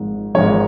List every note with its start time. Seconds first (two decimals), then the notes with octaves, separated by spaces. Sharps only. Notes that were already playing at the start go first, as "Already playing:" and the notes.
Already playing: G#1 G#2 F3
0.34 G#1 G#2 F3 C#5